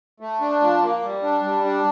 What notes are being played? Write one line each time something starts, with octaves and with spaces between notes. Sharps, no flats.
A3
D4
F3
A#3
G3
D4
G3
D4